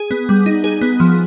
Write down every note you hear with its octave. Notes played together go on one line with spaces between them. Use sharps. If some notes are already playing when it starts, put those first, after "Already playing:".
Already playing: G#4
B3
G3
D#4
G#4
B3
F3